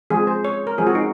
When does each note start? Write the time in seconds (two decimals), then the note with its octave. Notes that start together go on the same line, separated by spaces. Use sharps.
0.10 F3 G#3 C4 G#4
0.27 C5
0.45 C#5
0.67 A#4
0.78 F3 G#3 C4 G#4
0.87 F#4
0.95 D#4